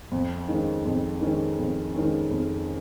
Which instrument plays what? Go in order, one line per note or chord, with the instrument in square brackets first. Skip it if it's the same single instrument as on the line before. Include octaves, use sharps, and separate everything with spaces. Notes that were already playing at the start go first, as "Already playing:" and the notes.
[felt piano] F2
D#3 G#3 C#4
F2
D#3 G#3 C#4
F2
D#3 G#3 C#4
F2